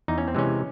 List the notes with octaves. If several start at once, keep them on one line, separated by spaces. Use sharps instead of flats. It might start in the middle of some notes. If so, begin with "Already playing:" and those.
E2 D#4
C#4
C4
C3 E3 G#3 C#4